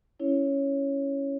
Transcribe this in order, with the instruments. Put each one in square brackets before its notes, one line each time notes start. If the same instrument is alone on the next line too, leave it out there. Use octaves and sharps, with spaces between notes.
[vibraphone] C#4 E4 C#5